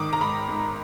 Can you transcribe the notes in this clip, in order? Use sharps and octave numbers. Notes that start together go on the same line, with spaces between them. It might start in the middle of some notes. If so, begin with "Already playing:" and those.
Already playing: G#2 D#3 D6 D#6
A#5
G#2 B5
G#2